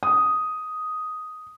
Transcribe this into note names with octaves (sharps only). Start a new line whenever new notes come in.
D#6